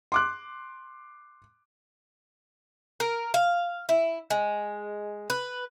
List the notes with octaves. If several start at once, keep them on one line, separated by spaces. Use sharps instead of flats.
C6 D6 F#6
A#4
F5
E4
G#3
B4